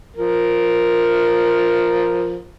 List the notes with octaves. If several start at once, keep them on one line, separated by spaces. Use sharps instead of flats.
F3 A#4